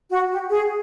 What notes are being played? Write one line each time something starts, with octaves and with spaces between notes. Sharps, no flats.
F#4
G4
G#4